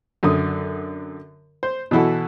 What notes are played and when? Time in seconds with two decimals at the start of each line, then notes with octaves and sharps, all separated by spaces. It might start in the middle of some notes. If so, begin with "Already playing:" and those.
0.23 F#2 D3 D#6
1.63 C5
1.91 B2 E3 E4 F#4 A4